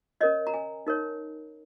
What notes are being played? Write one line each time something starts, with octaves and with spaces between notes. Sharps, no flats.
C#4 A#4 C#5 D#5
A#5
G#5
D#4 A#4 C#5